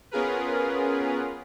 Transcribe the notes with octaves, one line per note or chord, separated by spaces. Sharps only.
B3 C#4 F4 G#4 A#4 B4